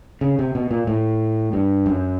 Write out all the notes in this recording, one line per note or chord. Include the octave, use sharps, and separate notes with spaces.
C#3
C3
B2
A#2
A2
G2
F#2